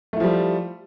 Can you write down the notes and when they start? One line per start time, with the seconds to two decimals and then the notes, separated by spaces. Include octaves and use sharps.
0.13 A3
0.17 E4
0.20 F3
0.24 G3